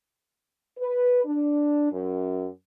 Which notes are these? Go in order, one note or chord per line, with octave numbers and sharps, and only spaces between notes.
B4
D4
F#2